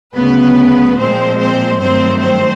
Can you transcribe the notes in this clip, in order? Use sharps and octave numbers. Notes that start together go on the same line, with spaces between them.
D2 C#3 F#3 B3 B4
A#2 F3 G#3 C4 C5
C4 C5
G2 D#3 F#3 A3 C4 C5
C4 C5